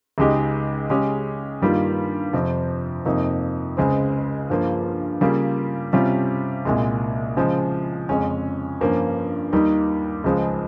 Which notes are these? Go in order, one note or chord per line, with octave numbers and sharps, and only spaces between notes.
C#2 C#3 G#3 D#4 G4
C#3 G#3 C#4 G4
G2 D#3 G3 A#3 F4
F2 C3 F3 C4
F2 C3 F3 A#3 D#4
C#2 C#3 G#3 C4
G2 F3 A#3 F4
C#3 G3 A#3 F4
C3 G3 C#4 F4
C2 A#2 G#3
C#3 F3 G#3
F2 C#3 G#3 C#4
G2 F3 A#3 C#4
D#2 D#3 G3 A#3 D#4
C#2 C#3 F3 G#3